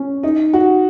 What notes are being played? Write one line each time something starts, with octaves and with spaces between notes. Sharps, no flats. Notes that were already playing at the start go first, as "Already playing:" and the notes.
Already playing: C#4
D#4
F#4